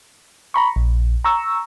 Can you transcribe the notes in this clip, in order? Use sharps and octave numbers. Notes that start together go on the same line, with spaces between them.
A#5 B5 C#6
A#1
A#5 C#6 E6